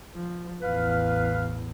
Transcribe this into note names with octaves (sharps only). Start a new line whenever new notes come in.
F3
A1 E2 B4 F5